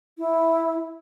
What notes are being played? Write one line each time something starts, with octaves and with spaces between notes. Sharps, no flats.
E4